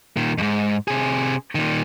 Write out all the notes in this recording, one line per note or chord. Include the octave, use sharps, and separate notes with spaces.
A#2 D#3
F2 G#2
C3 G#4
A#2 D#3